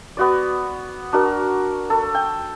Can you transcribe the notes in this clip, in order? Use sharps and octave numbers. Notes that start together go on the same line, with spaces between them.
B3 F#4 D5
D4 F#4 A#4
A4
G5